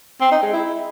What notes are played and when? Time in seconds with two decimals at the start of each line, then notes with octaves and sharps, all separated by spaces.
0.21 C4
0.32 D#4
0.43 G#3
0.53 E4